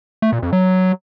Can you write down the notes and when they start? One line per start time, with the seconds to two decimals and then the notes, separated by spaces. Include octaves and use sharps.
0.22 A3
0.32 A#2
0.43 F2
0.53 F#3